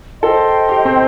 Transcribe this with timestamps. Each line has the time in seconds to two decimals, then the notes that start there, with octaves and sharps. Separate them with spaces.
0.22 A4 C5 D#5 G5 C6
0.69 G4
0.85 C4